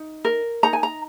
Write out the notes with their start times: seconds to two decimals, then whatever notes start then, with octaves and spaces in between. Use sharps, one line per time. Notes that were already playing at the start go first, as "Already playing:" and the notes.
Already playing: D#4
0.25 A#4
0.63 D#4 A#5
0.73 G#5
0.83 A#5